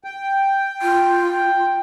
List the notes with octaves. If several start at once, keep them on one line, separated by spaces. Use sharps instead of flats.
G5
F4